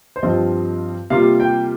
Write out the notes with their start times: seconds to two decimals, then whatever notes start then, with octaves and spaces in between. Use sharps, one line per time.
0.16 C5
0.23 G2 F3 C4 F4 D#5
1.10 C3 G3 A#3 F4 F5
1.40 G5